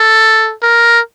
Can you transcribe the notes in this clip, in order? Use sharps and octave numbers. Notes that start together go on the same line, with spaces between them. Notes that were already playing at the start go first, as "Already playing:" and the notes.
Already playing: A4
A#4